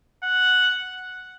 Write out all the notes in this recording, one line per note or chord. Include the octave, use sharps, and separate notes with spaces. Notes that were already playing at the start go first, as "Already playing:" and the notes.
F#5